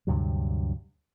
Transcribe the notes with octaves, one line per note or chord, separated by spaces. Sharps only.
D2 G2 C3 F#3